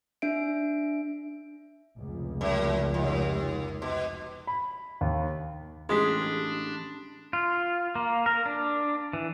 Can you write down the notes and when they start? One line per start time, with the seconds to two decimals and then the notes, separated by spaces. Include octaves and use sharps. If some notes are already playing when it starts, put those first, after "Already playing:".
0.22 D4 E5 D7
1.97 F1 C#2
2.41 F#2
2.94 D#2
3.82 B2
4.47 B5
5.01 D#2
5.89 A1 G#3 D4 G4 C6 D#6 B6
7.33 F4
7.96 A#3
8.26 A#4
8.46 D4
9.13 E3